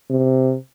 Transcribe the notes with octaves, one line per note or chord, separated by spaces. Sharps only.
C3